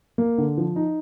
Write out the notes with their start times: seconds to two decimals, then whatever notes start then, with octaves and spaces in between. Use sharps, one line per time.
0.18 A#3
0.38 D3
0.58 F3
0.76 D#4